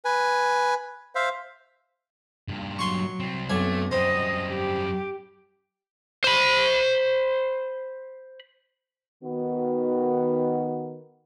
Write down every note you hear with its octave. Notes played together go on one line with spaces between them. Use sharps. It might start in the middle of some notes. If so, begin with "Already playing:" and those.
B4 G#5
C5 E5 F5
G2 A#2
F#3 C6 C#6
C2 C4
B1 F#2 A3 C4 G#5
F#2 G3 C4 D#5
G4
C5 B5
D#3 B3 F#4